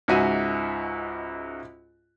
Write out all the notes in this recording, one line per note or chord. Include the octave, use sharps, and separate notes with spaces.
C#2 G#2 F#4 E5 D#7